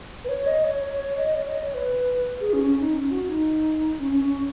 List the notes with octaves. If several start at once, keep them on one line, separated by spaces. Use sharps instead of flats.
B4
C#5
D#5
C#5
C#5
C#5
D#5
C#5
D#5
C#5
B4
G#4
C#4
C#4
D#4
C#4
F#4
D#4
C#4
C#4
C#4